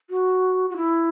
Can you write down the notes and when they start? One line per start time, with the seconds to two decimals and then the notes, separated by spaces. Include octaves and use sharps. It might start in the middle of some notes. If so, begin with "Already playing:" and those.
0.10 F#4
0.70 F#4
0.76 E4